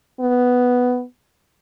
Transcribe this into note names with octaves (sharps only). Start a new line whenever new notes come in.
B3